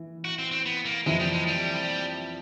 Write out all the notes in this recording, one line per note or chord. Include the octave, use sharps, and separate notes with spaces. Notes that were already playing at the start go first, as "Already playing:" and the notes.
Already playing: E3
F#4
C4
C4
B3
A#3
F2 C3 E3 G#3
G3
G#3
G3